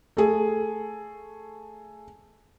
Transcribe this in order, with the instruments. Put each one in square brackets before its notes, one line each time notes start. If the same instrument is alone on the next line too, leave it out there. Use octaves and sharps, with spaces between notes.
[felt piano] A3 G#4